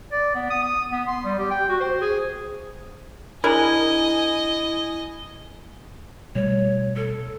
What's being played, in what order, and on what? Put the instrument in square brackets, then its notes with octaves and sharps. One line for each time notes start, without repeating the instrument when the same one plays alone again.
[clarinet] D5
B3
D#6
D#6
B3
C6
G3
G4
G5
F#4
C5
G#4
[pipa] D4 G#4 A#4 [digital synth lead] E4 [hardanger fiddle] D#5 G#5
[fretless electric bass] B2 G3 A3 [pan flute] C#5
[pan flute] A4